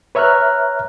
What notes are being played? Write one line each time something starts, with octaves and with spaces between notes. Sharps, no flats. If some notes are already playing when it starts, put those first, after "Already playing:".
B4 C#5 E5 A#5 F6 F#6